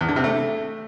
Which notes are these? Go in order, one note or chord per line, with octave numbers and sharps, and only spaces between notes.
E2
D3
C3
A3